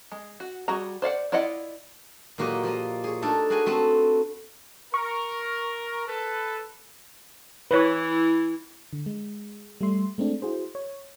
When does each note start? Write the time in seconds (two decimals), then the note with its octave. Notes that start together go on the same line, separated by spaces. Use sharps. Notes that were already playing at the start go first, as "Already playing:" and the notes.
0.12 G#3
0.40 F#4
0.68 G3 F#4 G#4 A#5
1.02 C5 D5 F5 F#5
1.32 E4 F4 D5 D#5 F#5
2.38 A#2 F#3 A#3 F#4 G4 D#5
2.63 F3 A#3 A#4 D#5
3.04 G#4 C#5
3.22 A3 D4 D#4 A4 A#4
3.50 F#4 G#4 A#4 B4 G#5
3.66 A3 C4 A4 B4
4.94 A#4 C#6
6.08 A4 B4
7.71 E3 E4 B4 C#5
8.93 D3
9.06 G#3
9.81 G3 A3 E5 C6
10.18 G#3 A3 C4 D4
10.42 E4 F#4 G#4 C5
10.75 C#5